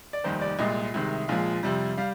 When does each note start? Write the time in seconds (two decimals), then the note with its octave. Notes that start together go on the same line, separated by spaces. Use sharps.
0.13 D5
0.24 F1 D#2 D#3 G3 C5
0.41 D5
0.59 C2 A#2 G#3 D#5
0.94 C2 C3 D#3 G#3
1.28 A#1 A#2 F3 G#3 F5
1.63 F2 C3 G3
1.97 G3 F5